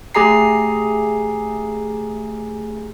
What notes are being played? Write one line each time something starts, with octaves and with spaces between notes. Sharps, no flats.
A3 G4 G#4 G#5 A#5 C7